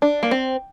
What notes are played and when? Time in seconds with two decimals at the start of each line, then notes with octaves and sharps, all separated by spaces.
0.02 D4
0.23 A#3
0.31 C4